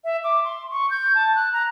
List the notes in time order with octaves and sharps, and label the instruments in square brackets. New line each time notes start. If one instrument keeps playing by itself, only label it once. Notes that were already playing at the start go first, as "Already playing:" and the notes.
[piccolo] E5
D6
C6
C#6
G6
A5
F#6
A#5